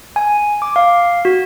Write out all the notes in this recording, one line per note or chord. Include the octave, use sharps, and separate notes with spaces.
G#5
D6
F5
F#4